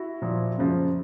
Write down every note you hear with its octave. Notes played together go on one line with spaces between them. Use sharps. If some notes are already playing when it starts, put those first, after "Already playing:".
Already playing: E4 F#4
A#2 F3
F#2 C#3 F3